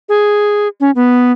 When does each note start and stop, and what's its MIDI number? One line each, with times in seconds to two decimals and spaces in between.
0.09 0.68 68
0.80 0.91 61
0.95 1.32 59